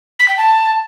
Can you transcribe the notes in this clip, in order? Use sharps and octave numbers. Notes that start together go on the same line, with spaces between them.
B6
G5
A5